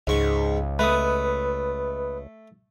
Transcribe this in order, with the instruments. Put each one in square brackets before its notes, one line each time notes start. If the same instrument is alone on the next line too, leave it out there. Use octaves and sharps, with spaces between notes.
[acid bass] C#2 [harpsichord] G#2 C#6
[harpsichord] A3 [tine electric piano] B4 D#6